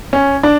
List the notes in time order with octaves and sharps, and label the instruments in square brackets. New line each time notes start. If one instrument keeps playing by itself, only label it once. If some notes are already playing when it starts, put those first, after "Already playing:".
[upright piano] C#4
D4